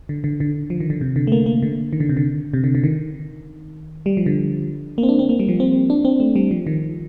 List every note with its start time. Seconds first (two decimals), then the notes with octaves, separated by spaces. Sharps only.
0.09 D3
0.24 D3
0.40 D3
0.70 F3
0.80 D#3
0.90 D3
1.01 C3
1.16 D3
1.27 A3
1.32 A#3
1.46 A#3
1.62 D3
1.93 D#3
2.00 D3
2.09 C3
2.17 D3
2.53 C3
2.64 D3
2.75 D3
2.84 D#3
4.06 G3
4.17 F3
4.26 D3
4.98 A#3
5.03 C4
5.09 D4
5.19 C4
5.29 A#3
5.39 G3
5.48 F3
5.60 C4
5.90 D4
6.05 C4
6.20 A3
6.36 G3
6.51 F3
6.67 D#3